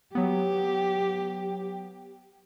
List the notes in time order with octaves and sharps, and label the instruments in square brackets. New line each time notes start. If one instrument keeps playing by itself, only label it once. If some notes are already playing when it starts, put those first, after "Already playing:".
[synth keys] F#3 B3 [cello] G4